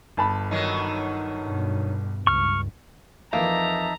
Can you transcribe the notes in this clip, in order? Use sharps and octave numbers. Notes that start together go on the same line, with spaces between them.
G1 A5 B5
D#3 F#3 D#4
G2 B2
C#2 G2 C#6 F6
F2 E3 A#3 D#4 E5 A5 A#5